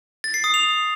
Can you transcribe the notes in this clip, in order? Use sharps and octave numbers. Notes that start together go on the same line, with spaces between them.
A6
C7
D#6
F7